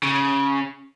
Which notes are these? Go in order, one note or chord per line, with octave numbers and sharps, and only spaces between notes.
C#3